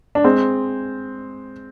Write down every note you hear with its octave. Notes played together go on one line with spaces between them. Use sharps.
D4
G#3 C4